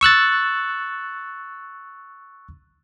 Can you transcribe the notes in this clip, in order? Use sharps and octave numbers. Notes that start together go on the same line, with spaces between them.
C#6 E6 F#6 A6